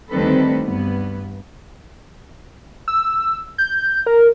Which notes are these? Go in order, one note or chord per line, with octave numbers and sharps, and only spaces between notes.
D2 D#3 G3 C4 A4 B4
G2 B3
E6
G6
A#4